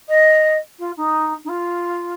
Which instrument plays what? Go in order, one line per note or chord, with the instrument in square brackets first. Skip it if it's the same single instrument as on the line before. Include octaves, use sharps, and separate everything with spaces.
[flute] D#5
F4
D#4
D#4
F4